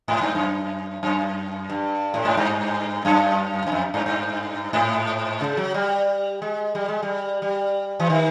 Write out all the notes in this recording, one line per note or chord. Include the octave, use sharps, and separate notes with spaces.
G#2
G2
F#2
F#2
G2
A2
G#2
G2
F#2
F#2
F2
G2
G2
G#2
C#3
F#3
G3
G#3
G3
G#3
G3
G3
E3
D#3